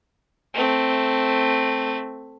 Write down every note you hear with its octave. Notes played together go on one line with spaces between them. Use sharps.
A3 C4